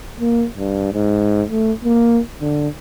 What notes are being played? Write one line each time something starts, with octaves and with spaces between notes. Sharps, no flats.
A#3
G2
G#2
A3
A#3
D3